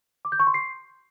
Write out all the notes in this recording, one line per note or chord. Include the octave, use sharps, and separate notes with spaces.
D6
G6
C#6
C6
C7